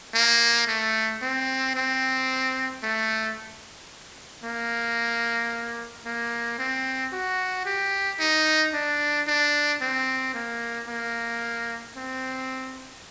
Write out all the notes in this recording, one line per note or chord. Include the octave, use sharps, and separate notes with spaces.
A#3
A3
C4
C4
A3
A#3
A#3
C4
F#4
G4
D#4
D4
D4
C4
A#3
A#3
C4